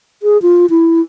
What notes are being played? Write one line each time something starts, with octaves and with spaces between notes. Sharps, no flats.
G#4
F4
E4